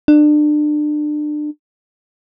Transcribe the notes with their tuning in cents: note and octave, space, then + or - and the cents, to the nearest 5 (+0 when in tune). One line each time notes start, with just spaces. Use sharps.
D4 +30